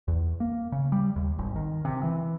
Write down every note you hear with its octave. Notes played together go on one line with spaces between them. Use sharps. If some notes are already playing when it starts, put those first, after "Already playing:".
E2
A#3
C#3
G3
D#2
G#1
D#3
C3
E3